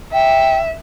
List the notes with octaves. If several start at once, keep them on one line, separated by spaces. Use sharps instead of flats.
E5 G5